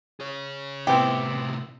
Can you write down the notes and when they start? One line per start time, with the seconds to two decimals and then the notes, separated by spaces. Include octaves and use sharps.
0.20 G#4 C#5
0.87 A2 C3 B3 C4 E4 G4